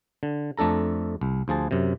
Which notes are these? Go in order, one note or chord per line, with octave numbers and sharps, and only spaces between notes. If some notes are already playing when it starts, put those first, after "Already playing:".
D3
F2 A3 D4 A4 A#5
C2
D2 F3 G#4 A5
F#2 C3